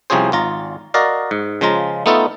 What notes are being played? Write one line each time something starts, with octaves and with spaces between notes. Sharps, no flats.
C2 C3 F3 C#4 G#4 C5
G#1 F4 A#5
F#4 A#4 D5 D#5 F5
G#2
C#3 F3 G#3 F4 A#5
A3 B3 D#4 F4 A4